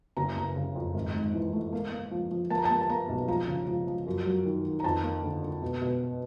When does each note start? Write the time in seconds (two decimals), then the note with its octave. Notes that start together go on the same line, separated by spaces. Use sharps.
0.17 F#1 A#5
0.37 F#1 A#5
0.56 C#3
0.75 F2
0.94 G#1
1.15 G#2
1.34 E3
1.53 A3
1.73 A#3
1.92 A#3
2.11 F3
2.31 F3
2.50 A#3 A5
2.58 A#5
2.65 A#3 A5
2.81 A5
2.89 A#3 A#5
3.09 B1
3.28 F3 A#5
3.48 C#3
3.67 F3
3.87 F3
4.07 F#2
4.26 F#3
4.45 D#3
4.65 D#3
4.80 A#5
4.84 F2 A5
5.04 A#3
5.23 D3
5.43 D3
5.62 B2
5.81 B2